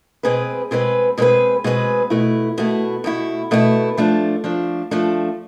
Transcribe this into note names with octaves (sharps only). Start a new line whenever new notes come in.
B2 G#3 C4 G#4 B4
B2 G#3 C4 G#4 B4
B2 G#3 C4 G#4 B4
B2 G#3 C4 G#4 B4
B2 A3 E4
B2 A3 E4
B2 A3 E4
B2 A3 E4
F3 A3 D4
F3 A3 D4
F3 A3 D4